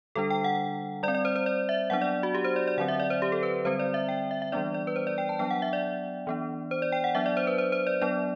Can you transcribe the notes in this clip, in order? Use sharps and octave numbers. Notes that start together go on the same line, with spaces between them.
D3 G3 D4 A4
G5
F#5
G3 D5
C4
D5
C5
C5
D5
E5
F#3 B3 D4 F#5
D5
F#4
G4
C5
D5
D5
D3 F#3 C4 F#5
E5
D5
C5
G4
A4
B4
D3 G3 C4 C5
D5
E5
G5
E5
E5
E3 G3 B3 D4 D5
D5
B4
C5
D5
G5
A5
F#3 B3 D4 G5
F#5
E5
D5
E3 B3 D4
C5
D5
G5
F#5
F#3 B3 D4 E5
D5
C5
B4
C5
C5
D5
F#3 B3 D4 D5